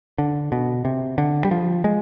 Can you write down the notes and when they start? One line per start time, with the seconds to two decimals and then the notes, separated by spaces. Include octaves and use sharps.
0.18 D3
0.52 B2
0.85 C3
1.18 D3
1.45 G3
1.51 F3
1.84 G#3